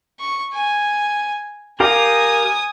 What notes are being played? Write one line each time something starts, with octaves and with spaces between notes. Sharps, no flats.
C#6
G#5
G4 A#4 F5 G#5 D#6